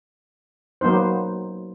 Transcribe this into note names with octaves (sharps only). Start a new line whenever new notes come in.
F#3 A#3 B3 D#4 C5